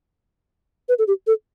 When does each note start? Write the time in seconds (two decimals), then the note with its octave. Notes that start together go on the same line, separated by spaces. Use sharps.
0.89 B4
0.99 A4
1.08 G4
1.27 A4